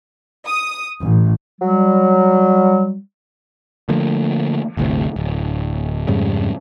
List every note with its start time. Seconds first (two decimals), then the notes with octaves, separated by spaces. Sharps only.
0.46 D#6
1.01 A1
1.61 F#3 G3
3.89 D3 F3 A3 A#3
4.77 G1 D2 A2 C3
5.16 D1
6.07 F2 G#2 C#3 G3